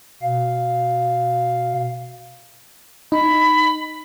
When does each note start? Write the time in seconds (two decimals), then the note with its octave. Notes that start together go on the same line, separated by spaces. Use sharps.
0.22 B2 F5
3.12 D#4 B5